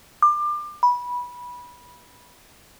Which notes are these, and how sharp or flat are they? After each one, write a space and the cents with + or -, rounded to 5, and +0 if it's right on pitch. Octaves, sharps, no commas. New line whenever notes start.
D6 +30
B5 -15